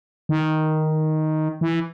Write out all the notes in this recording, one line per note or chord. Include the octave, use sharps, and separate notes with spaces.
D#3
E3